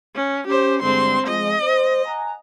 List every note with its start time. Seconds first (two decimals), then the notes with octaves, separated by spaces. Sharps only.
0.15 C#4
0.47 C#4 G4 C5
0.82 G2 D3 G#3 C4 C6
1.27 F3 G#3 D#5
1.63 C5
2.06 F#5 G#5 A#5